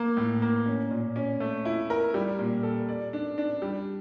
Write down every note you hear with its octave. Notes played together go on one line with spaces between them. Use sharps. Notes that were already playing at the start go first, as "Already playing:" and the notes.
Already playing: A#3
A2
A#3
C#4
A#2
C#4
A3
E4
A#4
G3
A#2
A4
D5
D4
D4
G3